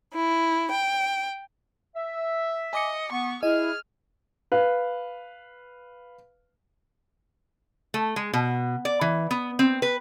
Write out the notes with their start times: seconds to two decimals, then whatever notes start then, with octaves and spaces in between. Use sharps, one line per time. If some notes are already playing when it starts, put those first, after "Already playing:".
0.13 E4
0.70 G5
1.95 E5
2.73 D#5 G#5 D6 C#7
3.12 B3 C#6
3.43 E4 G#4 D#5 G#5 F6
4.52 B4 F5
7.94 A3
8.16 G#3
8.34 B2
8.85 D5
9.01 E3
9.31 B3
9.59 C4
9.82 B4